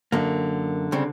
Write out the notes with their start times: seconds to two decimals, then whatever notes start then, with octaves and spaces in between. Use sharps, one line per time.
0.12 F#2 D3 A#3
0.92 C#3 G3 C4